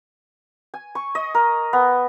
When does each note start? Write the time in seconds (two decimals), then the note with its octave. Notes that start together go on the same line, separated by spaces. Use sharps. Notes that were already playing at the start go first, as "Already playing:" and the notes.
0.74 G#5
0.95 C#6
1.15 D#5
1.35 A#4
1.73 B3